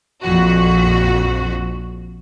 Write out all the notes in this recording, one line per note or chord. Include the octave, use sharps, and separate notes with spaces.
A#1 F2 F#4